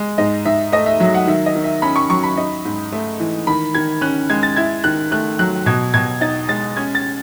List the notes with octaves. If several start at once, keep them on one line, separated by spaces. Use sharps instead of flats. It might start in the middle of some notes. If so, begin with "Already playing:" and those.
Already playing: G#3
G#2 D#5
G#2 E5
A3 D#5
E5
F#3 E5
F#5
D#3 E5
D#5
D#3
E5
C#4 B5
C#6
F#3 C#6
B5
D#4
G#2
A3
E3
D#3 B5
D#3 G#6
C#4 F#6
G#3 G#6
A6
E4 G#6
D#3 F#6
A3 F#6
F#3 F#6
B2 G#6
B2 G#6
D#4 A6
G#3 A6
C#4 G#6
A6